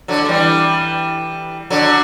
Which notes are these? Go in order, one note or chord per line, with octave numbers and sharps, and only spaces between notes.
D3 F#3
A3
E3 G3
D3 F#3